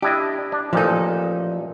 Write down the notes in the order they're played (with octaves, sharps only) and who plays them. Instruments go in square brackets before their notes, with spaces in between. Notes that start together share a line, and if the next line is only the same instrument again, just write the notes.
[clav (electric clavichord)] D4 E4 D#5 [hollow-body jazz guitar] G4
[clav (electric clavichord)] D4
[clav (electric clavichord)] A1 A#2 D#4 [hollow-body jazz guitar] F3 A4